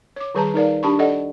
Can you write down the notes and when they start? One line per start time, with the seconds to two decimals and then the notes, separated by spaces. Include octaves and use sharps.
0.16 C#5 D6
0.35 D#3 G3 G#4 B4 A5 A#5
0.54 D#4 A#4 D5 F5
0.83 D4 G4 A5 B5 C#6
0.99 A4 D5 D#5 F#5